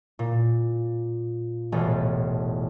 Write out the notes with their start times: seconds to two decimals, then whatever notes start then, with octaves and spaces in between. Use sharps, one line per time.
0.19 A#2
1.72 E1 A1 A4